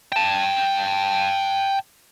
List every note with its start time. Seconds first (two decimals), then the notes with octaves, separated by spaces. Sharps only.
0.13 G5 A5